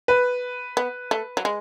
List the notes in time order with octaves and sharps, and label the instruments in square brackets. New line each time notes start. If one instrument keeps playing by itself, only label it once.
[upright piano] B4
[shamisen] B3
A3
F#3
G#3